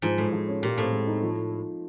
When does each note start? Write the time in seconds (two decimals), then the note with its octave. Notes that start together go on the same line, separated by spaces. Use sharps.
0.02 G#2 F3
0.18 A2 G#3
0.32 F3
0.48 C#4
0.62 A#2 G4
0.78 A2 C4
0.92 G#3
1.07 D#4
1.23 F3